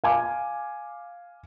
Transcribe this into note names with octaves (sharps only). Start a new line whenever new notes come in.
F5 G#5 D6